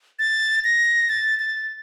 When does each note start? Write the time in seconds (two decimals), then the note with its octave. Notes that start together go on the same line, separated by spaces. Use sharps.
0.19 A6
0.64 A#6
1.09 A6
1.39 A6